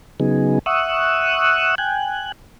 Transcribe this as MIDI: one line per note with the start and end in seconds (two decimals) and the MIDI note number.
0.20 0.59 49
0.20 0.59 54
0.20 0.59 59
0.20 0.59 63
0.20 0.59 68
0.66 1.75 76
0.66 1.75 78
0.66 1.75 85
0.66 1.75 87
0.66 1.75 88
0.66 1.75 90
1.78 2.32 79
1.78 2.32 80
1.78 2.32 90